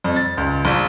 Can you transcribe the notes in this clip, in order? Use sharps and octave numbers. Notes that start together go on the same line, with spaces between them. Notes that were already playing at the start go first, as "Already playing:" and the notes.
F2
A6
C#2
A#1